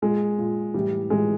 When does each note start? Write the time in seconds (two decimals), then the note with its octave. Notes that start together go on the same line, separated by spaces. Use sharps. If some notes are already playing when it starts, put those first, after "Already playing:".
0.02 A#2 G#3
0.38 A#2
0.74 A2 E3 G3
1.10 A2 E3 G#3